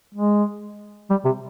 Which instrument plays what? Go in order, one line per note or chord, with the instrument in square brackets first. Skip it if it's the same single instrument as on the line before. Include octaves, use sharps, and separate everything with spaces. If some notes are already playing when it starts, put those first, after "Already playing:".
[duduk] G#3
G3
C3